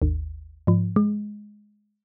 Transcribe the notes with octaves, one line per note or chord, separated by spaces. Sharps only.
G#1 D#2
G#2 F3
G#3